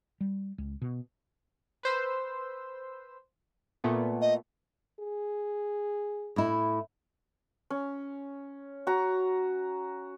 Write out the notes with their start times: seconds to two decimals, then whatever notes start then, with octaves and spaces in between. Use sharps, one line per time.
0.21 G3
0.58 C#2
0.82 B2
1.83 B4 C5 E6
3.84 A#2 A3 B3
4.21 D#5
5.00 G#4
6.36 A2 E4
7.70 C#4
8.87 F#4 A#5